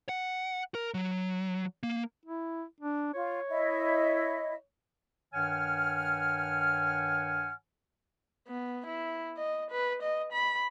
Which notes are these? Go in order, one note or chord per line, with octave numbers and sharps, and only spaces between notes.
F#5
A#4
F#3
A#3
E4
D4
F4 C#5
E4 D#5 E5
G2 D#3 C#5 F#5 G#5 F6
B3
E4
D#5
B4
D#5
B5